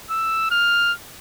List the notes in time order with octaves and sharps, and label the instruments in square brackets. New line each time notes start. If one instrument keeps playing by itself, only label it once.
[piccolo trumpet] E6
F6